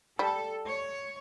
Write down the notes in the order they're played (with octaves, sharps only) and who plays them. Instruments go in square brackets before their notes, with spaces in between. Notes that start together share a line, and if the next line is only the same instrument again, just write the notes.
[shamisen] G3 [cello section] A4
[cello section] C#5